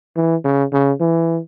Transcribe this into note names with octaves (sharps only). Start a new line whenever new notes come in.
E3
C#3
C#3
E3